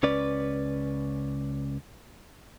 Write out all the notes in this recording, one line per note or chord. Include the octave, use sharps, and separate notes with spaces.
C#2 C#4 B4 D5